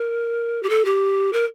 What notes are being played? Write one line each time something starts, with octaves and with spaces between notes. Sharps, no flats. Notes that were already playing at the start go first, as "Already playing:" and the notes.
Already playing: A#4
G4
A4
G4
A#4